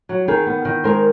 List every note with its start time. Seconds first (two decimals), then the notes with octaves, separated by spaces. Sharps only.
0.09 F#3
0.28 D#3 G#4 A#4
0.47 B3
0.65 D#3
0.84 G#3 A#4 C5